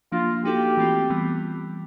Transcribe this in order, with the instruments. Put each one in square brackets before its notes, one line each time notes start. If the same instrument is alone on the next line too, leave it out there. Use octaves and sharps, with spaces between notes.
[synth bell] F3 A#3 D4 [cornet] F4
[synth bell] A#3 D#4 F#4 A4 [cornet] G4
[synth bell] E3 A3 C4 F4
E3 G3 B3